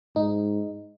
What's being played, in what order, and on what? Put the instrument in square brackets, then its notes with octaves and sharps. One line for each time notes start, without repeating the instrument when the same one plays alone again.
[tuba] G#2 [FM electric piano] D#4